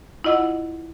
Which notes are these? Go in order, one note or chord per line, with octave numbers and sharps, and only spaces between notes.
E4 F4 D#5 F#5 E6